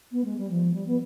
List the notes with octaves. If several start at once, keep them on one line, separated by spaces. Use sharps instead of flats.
B3
G#3
G3
F3
G3
B3